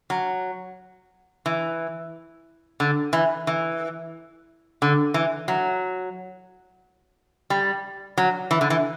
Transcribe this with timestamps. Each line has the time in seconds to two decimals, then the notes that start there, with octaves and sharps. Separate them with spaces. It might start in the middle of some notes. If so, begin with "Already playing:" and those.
0.10 F#3
1.46 E3
2.80 D3
3.13 E3
3.47 E3
4.82 D3
5.14 E3
5.48 F#3
7.50 G3
8.18 F#3
8.51 E3
8.61 D3
8.70 E3